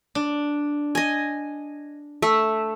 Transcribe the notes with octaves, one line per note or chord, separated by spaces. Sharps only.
D4
D#5 G#5
A3 E5